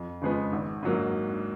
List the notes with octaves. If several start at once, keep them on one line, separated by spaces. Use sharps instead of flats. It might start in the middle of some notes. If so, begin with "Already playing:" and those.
Already playing: F2
C#3 F3 G#3 B3
G#1
G#2 F#3 A#3